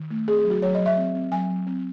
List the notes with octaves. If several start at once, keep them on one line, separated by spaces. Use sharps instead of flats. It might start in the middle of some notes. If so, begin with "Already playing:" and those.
Already playing: D#3
A3
C4 G#4
G#4
F#3
F#4
F#3 C#5
D#5
F#3
E5
C4
C4
F#3 G#5
F#3
C4